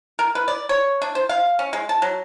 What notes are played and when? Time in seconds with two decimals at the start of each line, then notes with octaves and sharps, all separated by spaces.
0.19 A#4
0.35 B4
0.48 D5
0.69 C#5
1.02 D4
1.15 C5
1.29 F5
1.59 C#4
1.73 G#3
1.89 A5
2.02 F#3